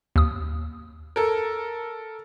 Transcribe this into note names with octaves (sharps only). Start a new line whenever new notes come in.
D#2 D#6
A4 A#4